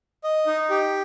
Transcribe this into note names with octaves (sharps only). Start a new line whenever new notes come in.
D#5
D#4
G4